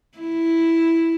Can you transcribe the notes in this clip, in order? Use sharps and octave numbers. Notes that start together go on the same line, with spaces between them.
E4